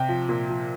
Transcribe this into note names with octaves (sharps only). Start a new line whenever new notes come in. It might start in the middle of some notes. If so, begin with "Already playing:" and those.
Already playing: C3 G5
F3
A#2
F3